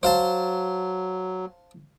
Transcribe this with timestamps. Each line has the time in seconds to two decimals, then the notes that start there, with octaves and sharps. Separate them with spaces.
0.03 F#3 C5 F5 A5